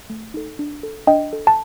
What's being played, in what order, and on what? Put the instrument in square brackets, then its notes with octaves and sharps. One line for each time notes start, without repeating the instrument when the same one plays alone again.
[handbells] A3
D#4 A4
D4
A4
D4 D#5 G5
A4
A5